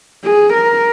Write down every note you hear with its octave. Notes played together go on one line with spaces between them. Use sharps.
G#4
A#4